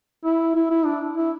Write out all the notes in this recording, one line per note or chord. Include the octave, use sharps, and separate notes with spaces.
E4
E4
E4
D4
E4